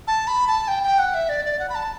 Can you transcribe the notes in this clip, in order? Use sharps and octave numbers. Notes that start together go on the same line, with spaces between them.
A5
B5
A5
G5
G5
F#5
E5
D5
D5
F#5
B5
A5